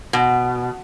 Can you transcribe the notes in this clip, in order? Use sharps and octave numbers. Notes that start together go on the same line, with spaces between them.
B2